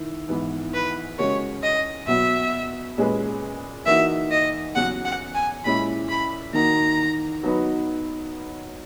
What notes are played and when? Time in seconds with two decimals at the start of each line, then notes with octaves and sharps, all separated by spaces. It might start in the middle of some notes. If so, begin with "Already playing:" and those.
Already playing: D#3 E4
0.29 G#2 E3 B3 E4
0.74 B4
1.18 C#3 G#3 C#4 F#4 A#4 C#5
1.63 D#5
2.07 B2 F#3 B3 E5
2.97 A#2 G#3 C#4 G#4 B4
3.86 E3 A#3 D#4 F#4 E5
4.30 D#5
4.75 E2 C#3 F#3 C#4 F#5
5.05 F#5
5.35 G#5
5.65 A#2 G#3 C#4 E4 B5
6.09 B5
6.53 D#3 A#3 D#4 F#4 A#5
7.43 F#3 B3 D#4 F#4 B4